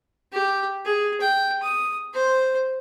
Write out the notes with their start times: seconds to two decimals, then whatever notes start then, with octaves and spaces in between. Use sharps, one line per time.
0.32 G4
0.85 G#4
1.21 G5
1.63 D#6
2.14 C5